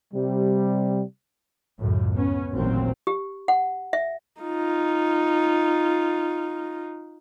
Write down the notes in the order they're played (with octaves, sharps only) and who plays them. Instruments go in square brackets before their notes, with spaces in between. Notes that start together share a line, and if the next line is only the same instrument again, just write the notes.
[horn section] C3 G3
[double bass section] C#2 F#2 A2
B3 C#4
A1 D#2 A#2 F#3 C4
[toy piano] G4
F#5
E5
[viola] D#4 F4